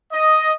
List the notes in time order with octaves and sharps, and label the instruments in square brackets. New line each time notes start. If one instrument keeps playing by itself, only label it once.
[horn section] D#5